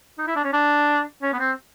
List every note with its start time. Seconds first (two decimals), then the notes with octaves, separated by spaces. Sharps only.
0.18 D#4
0.27 E4
0.36 D4
0.44 C#4
0.53 D4
1.22 C#4
1.33 B3
1.39 C4